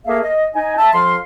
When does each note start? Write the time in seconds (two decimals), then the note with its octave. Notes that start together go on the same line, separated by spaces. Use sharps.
0.06 A3 A#3 G#4 A#4 E5 F5
0.23 D#5
0.55 D#4 G#5
0.77 E5 A5
0.93 F2 F3 F5 C6